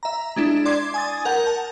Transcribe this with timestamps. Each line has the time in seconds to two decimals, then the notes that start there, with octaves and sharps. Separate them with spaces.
0.03 E5 A#5
0.36 G#3 D4 E4
0.65 D5 C6 D6 G#6
0.94 G#5 D#6 A6
1.25 A#4 F#5 G6
1.47 A5